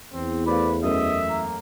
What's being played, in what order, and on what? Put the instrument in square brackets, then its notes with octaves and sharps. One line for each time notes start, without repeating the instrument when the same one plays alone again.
[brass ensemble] E2 [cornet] C4
[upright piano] A3 C5 F5 [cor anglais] B4 [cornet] D5
[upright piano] F#2 A3 A#4 [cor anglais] D#5 [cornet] E5
[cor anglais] A#3